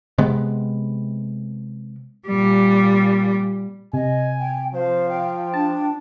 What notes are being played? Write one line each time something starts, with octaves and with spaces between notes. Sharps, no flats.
C3 G#3 B3
A#2 G3
C3 D#5 G#5
G5
F3 C5 F5
G5
D4 A5